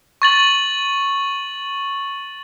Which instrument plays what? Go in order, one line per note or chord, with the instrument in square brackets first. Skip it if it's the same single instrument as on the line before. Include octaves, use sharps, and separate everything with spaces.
[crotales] C#6 A6 F#7